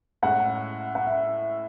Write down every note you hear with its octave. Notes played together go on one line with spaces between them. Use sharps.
A2 G#3 C#4 E4 F#5
F#5
E5